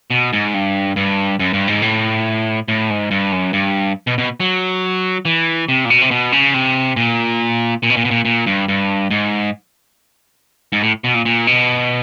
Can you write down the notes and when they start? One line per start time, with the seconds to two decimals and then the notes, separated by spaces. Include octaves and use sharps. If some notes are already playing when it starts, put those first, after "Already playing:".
0.10 B2
0.33 G#2
0.54 G2
0.96 G2
1.39 F#2
1.53 G2
1.68 G#2
1.82 A2
2.68 A2
2.90 G#2
3.11 G2
3.32 F#2
3.53 G2
4.07 B2
4.18 B2
4.40 F#3
5.25 E3
5.69 C3
5.85 A#2
5.90 B2
6.02 C3
6.11 B2
6.32 C#3
6.54 C3
6.96 A#2
7.83 A#2
7.90 B2
7.97 A#2
8.05 B2
8.11 A#2
8.25 A#2
8.46 G2
8.68 G2
9.11 G#2
10.72 G#2
10.82 A2
11.04 B2
11.14 A#2
11.25 A#2
11.47 B2